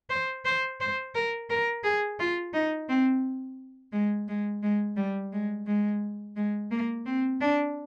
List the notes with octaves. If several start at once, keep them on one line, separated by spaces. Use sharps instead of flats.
C5
C5
C5
A#4
A#4
G#4
F4
D#4
C4
G#3
G#3
G#3
G3
G#3
G#3
G#3
A#3
C4
D4